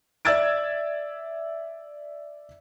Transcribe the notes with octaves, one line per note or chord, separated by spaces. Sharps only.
D5 E5 E6 G#6 A6 D7